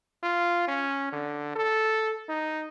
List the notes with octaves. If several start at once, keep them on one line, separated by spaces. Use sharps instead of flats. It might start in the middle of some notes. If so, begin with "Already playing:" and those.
F4
C#4
D3
A4
D#4